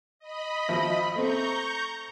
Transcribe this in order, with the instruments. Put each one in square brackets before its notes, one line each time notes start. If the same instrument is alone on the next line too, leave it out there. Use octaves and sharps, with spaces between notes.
[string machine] D#5 B5
[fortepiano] G#1 F3 E5
[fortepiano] A3 C4 [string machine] A#5 C#6 G6